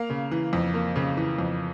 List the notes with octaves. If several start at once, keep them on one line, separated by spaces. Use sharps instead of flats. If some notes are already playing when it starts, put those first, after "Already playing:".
Already playing: A#3 F5
C#3
E3
F2
A#3
C#3
E3
F2